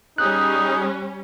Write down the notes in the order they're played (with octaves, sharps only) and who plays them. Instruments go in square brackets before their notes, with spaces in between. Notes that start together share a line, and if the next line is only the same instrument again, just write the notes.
[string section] G3 C#4 [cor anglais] D#4 [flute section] G#4 C#6 D#6 [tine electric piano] F#6